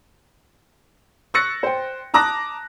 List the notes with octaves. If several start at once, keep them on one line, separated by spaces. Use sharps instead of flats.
C#6 E6 F#6 A6 A#6 C#7
C5 G5
A5 A#5 D6 D#6 F#6 A#6